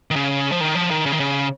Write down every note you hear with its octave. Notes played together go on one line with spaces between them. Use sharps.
D#3
C#3
F3
D#3
F3
D#3
C#3
D#3
C#3